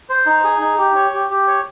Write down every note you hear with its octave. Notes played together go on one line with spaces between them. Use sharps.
C5
D#4
G#4
D#4
G4
C#5
G4
G4
C#5